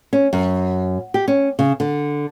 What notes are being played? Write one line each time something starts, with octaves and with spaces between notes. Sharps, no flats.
C#4
F#2
G4
C#4
C#3
D3